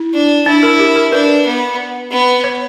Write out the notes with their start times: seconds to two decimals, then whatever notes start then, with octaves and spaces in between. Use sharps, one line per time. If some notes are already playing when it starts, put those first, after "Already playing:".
Already playing: E4
0.13 D4
0.46 D4 E4
0.63 A#4
0.79 G4
0.96 A#4
1.12 D4 B4
1.46 B3
2.11 B3
2.44 C#5